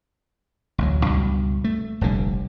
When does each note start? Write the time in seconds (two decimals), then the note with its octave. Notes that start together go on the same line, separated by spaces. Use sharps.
0.78 A1 D2 F#3
1.06 C#2 G2 B2
1.64 A3
2.01 F1 A#1 D3 G3